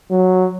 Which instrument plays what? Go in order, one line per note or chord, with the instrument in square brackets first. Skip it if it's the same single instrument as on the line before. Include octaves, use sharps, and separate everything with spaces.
[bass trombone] F#3